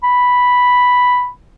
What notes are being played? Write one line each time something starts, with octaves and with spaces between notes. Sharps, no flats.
B5